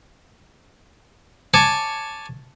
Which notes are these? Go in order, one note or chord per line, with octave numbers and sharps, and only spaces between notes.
C#5 G#5 A5 D6